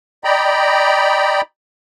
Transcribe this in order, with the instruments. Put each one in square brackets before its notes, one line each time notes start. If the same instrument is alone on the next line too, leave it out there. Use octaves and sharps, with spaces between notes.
[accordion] D5 D#5 G5 A#5 B5